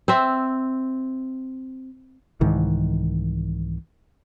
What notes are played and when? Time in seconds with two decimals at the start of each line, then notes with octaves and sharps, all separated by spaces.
0.08 C4 E5
2.41 C2 G#2 D#3 E3